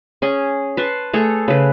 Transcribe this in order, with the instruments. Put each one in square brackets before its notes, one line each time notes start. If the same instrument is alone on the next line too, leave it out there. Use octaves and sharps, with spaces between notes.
[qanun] C#4 G#4 G#5
B4 A5 C6 C#6
A3 G#4 A4 C#5
C#3 B4